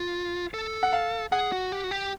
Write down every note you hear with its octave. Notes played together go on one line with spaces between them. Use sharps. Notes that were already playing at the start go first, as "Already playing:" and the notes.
Already playing: F4
A4
F#5
F5
G#4 F#5
F#4
G4
F#4
G4